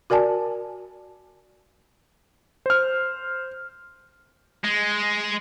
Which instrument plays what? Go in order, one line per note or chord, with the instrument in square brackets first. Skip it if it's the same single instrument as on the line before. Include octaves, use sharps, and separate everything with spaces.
[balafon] F#4 A#4 D5 G#5 A5
[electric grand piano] C5 F6
[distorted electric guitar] G#3